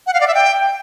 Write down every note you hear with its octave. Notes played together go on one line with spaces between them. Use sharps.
F#5
F5
D5
E5
G5